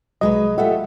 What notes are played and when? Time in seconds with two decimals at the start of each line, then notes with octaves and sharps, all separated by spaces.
0.21 C2 F#3 G#3 B4 D#5
0.58 A3 F4 G4 A4 E5 F#5